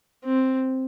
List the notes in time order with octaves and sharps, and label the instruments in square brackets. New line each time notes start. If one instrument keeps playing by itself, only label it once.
[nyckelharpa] C4